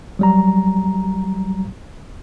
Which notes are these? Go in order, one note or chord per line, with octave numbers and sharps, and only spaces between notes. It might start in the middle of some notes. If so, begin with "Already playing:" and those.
F#3 G3 A#5